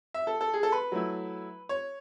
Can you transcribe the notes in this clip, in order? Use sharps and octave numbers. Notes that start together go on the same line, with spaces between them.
E5
A4
A4
G#4
A4
B4
F#3 A3 E4
C#5